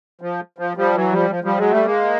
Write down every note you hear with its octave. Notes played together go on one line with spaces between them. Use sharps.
F3
F3
F3 G3
E3 F#3
F3 G3
F3
F3 G3
F#3 G#3
G3 A3
G#3 A#3